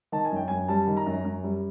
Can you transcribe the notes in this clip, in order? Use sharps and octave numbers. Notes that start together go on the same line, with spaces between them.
D#3 A5
G#5
F#2 G5
F#2 G#5
G3 A5
D#3
A#5
F#2
F#2
G3